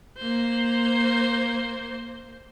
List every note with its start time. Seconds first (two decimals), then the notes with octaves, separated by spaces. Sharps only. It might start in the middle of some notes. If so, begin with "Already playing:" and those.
0.18 A#3 C5